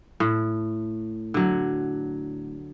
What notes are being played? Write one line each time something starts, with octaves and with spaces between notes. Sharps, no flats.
A2
D3 F#3